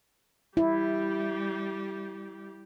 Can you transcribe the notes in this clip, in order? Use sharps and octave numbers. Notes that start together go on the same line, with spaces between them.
G3 E4 G4